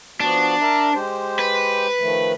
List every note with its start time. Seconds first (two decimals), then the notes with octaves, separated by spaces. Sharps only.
0.20 F3 B3 D4 F#4
0.61 A#4 E5 A#5
0.94 G#3 G4 C5
1.39 B4
1.99 D#3 F3 A3